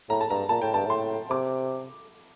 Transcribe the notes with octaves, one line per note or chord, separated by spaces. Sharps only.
A2 A#5
A5
G2 A#5
A#2 A5
A2 G5
G2 A5
A2 C6
C3 D6